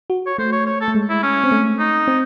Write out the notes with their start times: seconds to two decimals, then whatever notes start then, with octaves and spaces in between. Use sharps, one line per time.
0.10 F#4
0.26 C#5
0.38 A3 C5
0.52 C#5
0.66 C#5
0.81 A4
0.88 A3
0.95 G#3
1.09 E4
1.23 C#4
1.44 C4
1.51 A3
1.79 D#4
2.08 C4